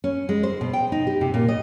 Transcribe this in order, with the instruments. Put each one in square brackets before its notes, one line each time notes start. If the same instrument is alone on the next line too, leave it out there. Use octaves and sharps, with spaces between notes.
[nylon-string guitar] C#4
G#3
C5
B2
G5
D#4
G4
C3
A#2
D#5